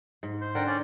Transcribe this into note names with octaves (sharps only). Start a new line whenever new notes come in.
G#2
C5
D3 C4 D4 A#4 F#5 G5
C#4 D5